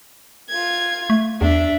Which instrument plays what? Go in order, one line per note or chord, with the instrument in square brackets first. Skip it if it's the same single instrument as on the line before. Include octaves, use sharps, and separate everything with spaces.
[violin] F4 G#6
[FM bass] A3
[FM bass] E2 [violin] D4 E5